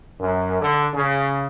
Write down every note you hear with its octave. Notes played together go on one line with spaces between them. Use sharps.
F#2
D3
C#3